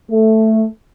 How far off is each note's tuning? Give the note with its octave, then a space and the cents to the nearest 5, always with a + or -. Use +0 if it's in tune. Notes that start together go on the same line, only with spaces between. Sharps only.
A3 +0